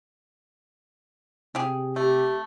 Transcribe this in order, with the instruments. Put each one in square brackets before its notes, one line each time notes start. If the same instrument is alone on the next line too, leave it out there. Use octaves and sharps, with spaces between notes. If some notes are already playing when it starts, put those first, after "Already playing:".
[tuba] C3 [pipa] G4 G#4
[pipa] A3 [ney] G4